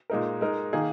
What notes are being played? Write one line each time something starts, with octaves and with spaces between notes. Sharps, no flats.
A#2 G#3 D#4 A#4
G#3 D#4 A#4
D#3 A#3 D#4 G#4